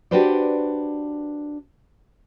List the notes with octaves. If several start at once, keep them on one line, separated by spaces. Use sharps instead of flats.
D4 F#4 G4 B4 C5 D5